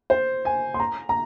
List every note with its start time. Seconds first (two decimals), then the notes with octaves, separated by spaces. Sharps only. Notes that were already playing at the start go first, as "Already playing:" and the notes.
0.10 C5
0.45 G#5
0.74 C6
0.80 A#5
1.09 A#5